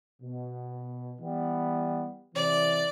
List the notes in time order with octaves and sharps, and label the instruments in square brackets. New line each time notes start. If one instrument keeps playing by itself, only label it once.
[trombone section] B2
E3 G3 B3
[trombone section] C3 E3 [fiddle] D5